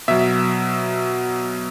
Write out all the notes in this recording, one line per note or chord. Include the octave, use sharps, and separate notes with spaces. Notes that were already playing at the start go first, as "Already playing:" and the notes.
B2 F#3 E5